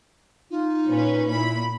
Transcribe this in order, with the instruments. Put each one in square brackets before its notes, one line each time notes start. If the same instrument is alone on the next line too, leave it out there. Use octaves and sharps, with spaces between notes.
[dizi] D#4 [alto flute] F4
[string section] A#2 C#4 B4
[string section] A#2 B5 [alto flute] E4